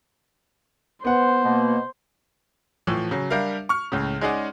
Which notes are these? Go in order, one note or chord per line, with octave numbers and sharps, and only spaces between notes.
B3 C5 F#5
B2 A#3
A2 E3 F3
C#3 F#3
G3 D4 A#4 E5 F5
C#6 F6
C#2 A2 C#3
G#3 C#4 D#4 G#4 D5 F#5